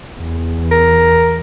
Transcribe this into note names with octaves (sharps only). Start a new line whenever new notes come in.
E2
A#4